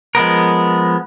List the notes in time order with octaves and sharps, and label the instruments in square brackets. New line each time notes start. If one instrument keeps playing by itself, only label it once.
[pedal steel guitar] F3 G#3 B3 A#4